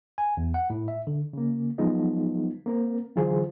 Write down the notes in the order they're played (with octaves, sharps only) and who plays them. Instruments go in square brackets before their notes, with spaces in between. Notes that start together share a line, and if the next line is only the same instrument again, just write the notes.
[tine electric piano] G#5
E2
F#5
A2
E5
D3
[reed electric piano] C#3 A#3
F3 F#3 G#3 B3 D#4 F4
A#3 C4 A#4
D3 E3 F#3 F4 G#4 C5